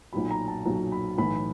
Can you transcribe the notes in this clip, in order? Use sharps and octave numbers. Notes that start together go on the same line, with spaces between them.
B1 A#2 F#3 B5
A#5
A5
B1 A#2 F#3 A#5
B5
B1 A2 E3 B5